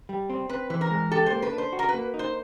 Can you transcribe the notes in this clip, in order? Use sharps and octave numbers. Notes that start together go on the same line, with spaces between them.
G3
C4
C4 B4
E3 B4
A#4
G#3
G4 A4
C5
A#3
B4
D4
C5
F#4
A#4
B4
A#3
D#4
C5